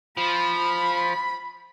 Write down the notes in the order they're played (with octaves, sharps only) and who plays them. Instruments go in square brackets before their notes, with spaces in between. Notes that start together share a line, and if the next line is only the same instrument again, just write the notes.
[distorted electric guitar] F3 [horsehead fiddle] B5